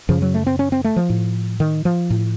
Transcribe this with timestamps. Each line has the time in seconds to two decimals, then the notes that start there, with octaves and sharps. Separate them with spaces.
0.09 F#2 C#3 F3
0.22 F#3
0.34 A3
0.47 C4
0.59 C#4
0.72 C4
0.84 A3
0.96 F3
1.10 A2
1.60 D#3
1.85 F3
2.10 A2